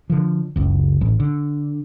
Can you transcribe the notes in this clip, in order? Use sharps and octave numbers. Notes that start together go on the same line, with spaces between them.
D3 F3
F#1 C#2
A1
D3